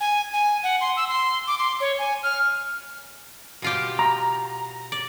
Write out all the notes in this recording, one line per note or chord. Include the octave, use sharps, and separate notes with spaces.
G#5
G#5
F#5
C6
E6
C6
D6
C6
C#5
G#5
F6
B2 F4 G4
A#5
D5